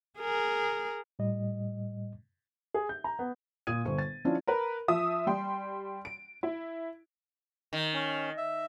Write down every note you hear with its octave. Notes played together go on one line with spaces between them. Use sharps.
G#4 A#4
A2 G3 D#5
G#4
G6
A#5
B3
A#2 D#6 G#6 D#7
G1 C5 C#6
A6
F3 C#4 D4 E4 F4
A#4 B4
F3 E5 D#6
G3 G5 C6
D7
E4
D#3
C#4
E5